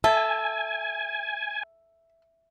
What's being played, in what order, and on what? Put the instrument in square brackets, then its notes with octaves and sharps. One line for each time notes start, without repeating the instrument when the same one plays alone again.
[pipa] A4 [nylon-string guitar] E5 [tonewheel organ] G#5